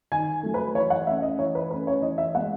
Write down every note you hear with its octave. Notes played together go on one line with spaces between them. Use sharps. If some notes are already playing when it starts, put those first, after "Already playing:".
D#3 G#5
F#3 A3
B4
E3 C#5
F#5
A3 C#4 E5
D#5
E3 C#5
B4
A3 C#4 B4
C#5
E3 D#5
E5
G#3 B3 F#5